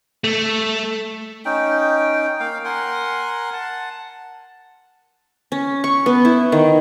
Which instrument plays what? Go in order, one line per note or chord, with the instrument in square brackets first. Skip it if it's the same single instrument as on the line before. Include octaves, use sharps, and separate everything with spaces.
[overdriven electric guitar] A3
[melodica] C#4 D#4 G5
A#3 F5 G5
A#4 F#5 G#5 C6
F#5 A5
[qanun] C#4
C#6
B3
E4
D#3